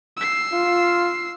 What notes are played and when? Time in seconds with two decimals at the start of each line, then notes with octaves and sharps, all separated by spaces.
0.17 E6 C7
0.53 F4